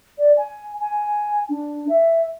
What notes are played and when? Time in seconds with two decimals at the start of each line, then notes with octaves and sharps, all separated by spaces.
0.18 D5
0.37 G#5
0.79 G#5
1.49 D4
1.88 E5